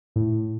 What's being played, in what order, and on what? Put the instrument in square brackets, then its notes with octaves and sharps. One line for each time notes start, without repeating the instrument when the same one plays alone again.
[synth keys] A2